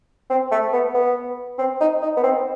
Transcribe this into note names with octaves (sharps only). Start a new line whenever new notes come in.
C4
A3
B3
B3
C4
D#4
D#4
B3
C4